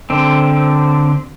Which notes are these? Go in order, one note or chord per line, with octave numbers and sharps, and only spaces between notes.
D3 C4